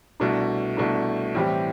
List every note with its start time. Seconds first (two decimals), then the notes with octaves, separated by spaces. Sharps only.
0.20 C2 B2 A3 D4
0.77 C2 B2 A3 D4
1.35 A2 E3 G3 C4 G4